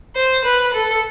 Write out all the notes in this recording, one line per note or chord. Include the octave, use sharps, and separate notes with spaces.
C5
B4
A4